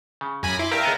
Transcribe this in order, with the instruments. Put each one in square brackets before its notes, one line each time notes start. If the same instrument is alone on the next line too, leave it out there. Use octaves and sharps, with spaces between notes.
[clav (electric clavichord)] C#3
[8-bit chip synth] F#2 G#5 B5 [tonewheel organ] A#5
[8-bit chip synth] E4 [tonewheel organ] C6 D6
[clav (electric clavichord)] G2 G4 [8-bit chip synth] A#4 [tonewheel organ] E5 F5 A#5
[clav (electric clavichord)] C#2 B3 D#5